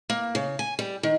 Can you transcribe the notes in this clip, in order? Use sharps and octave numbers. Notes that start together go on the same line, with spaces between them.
A#3
C#3
G#5
G3
D#3